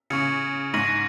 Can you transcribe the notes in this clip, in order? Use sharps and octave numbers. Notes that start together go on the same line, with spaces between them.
C#3 C#6 G#6 C#7
G#2 C#6 A#6 D#7 F#7